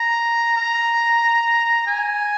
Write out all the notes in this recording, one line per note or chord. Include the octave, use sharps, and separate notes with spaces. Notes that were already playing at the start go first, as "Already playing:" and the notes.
Already playing: A#5
A#5
G#5